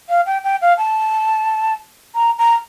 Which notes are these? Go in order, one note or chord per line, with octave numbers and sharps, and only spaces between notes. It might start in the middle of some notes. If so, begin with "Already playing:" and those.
F5
G5
G5
F5
A5
A#5
A#5